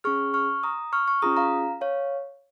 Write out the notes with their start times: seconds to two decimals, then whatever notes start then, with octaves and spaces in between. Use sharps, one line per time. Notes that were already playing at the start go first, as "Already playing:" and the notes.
0.04 C#4 G#4 C#6 F6
0.34 C#6 F6
0.63 A#5 D#6
0.93 C#6 F6
1.08 C#6 F6
1.22 C#4 F4 G#4 A#5 D#6
1.37 F5 A#5
1.81 C#5 F5